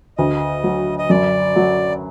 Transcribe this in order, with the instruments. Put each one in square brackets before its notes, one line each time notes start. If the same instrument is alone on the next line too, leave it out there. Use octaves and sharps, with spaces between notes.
[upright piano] D2 [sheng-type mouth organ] D#5
[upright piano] F#3
[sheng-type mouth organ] D#5
[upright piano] F#2 [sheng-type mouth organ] D5
[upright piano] F#3